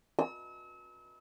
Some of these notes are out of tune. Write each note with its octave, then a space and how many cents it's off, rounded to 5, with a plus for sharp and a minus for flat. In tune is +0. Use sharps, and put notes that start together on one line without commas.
E6 -40